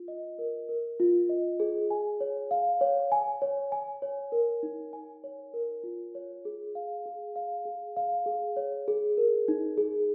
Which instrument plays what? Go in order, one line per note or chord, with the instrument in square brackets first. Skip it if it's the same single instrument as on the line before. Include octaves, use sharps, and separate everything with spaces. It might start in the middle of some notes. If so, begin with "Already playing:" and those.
Already playing: [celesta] F4
D#5
A#4
A#4
F4
D#5
G#4
G#5
C#5
F5
C#5
G#5
C#5
G#5
C#5
A#4
D#4
G#5
C#5
A#4
F4
C#5
G#4
F5
G#4
F5
G#4
F5
G#4
C#5
G#4
A#4
D#4
G#4